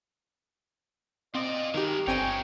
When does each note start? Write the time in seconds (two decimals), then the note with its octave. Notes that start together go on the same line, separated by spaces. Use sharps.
1.35 C4 F4 D5 D#5
1.74 D#3 G#3 D#4 G4 A#4
2.07 G1 C4 D#4 C#5 G5 G#5